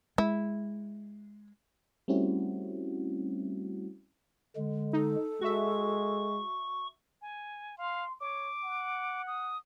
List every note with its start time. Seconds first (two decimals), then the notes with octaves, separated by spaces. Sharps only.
0.18 G#3 E4
2.08 G3 A3 C4 C#4 E4 F#4
4.56 D3 G#3
4.93 D#4 A4
5.41 G#3 F#4 E5 C#6
7.22 G#5
7.78 F5 C6
8.21 C#5 D6
8.64 F#5
9.27 D#6